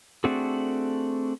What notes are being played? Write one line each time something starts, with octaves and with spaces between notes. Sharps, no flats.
A3 C4 D4 F#4 G#4 A4